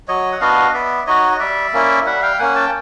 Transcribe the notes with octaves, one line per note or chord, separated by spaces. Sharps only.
F#3 C#5 D#5
F#5
B3 D4 F#4 D#5 F5
B3 D5 E5
D#4 F#4 C#5 D#5
G3 D5 E5
A#3 C#4 E4
G3 E5 F#5
F5 G5
A#3 C#4 F#5 G#5
G5 A5